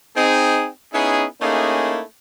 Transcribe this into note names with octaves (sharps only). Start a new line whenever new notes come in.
C4 D#4 G#4
B3 C#4 D#4 E4 G#4
A3 A#3 C#4 D#4 E4 G#4